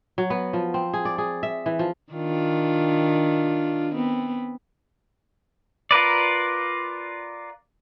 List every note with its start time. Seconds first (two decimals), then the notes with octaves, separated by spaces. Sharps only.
0.18 F#3
0.30 B3
0.53 F3
0.74 C4
0.94 G#4
1.05 D5
1.18 G#4
1.43 E5
1.66 E3
1.79 F3
2.12 D#3 D4 F4
3.94 B3 C4
5.91 F4 A#4 B4 D5